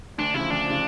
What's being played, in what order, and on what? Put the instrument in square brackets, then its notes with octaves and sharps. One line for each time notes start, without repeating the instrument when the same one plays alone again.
[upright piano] D2 [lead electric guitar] D4
[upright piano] C#3 F3 [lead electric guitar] E4
[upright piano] D2 [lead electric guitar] D4
[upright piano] C#3 F3